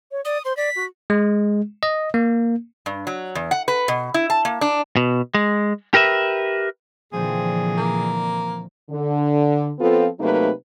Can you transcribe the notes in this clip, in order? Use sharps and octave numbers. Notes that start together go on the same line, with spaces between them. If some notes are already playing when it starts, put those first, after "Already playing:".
C#5
D5 D#6
C5 C6
D5 B6
F#4
G#3
D#5
A#3
G2
F#3
E2
F#5
B4
B2
E4
A5
A#3
D4
B2
G#3
G4 A#4 B4 E5
A#2 D3 E3 F3 C4 G#4
A#3
D3
F3 B3 C4 F4 A4
C3 F#3 A3 A#3 D#4 B4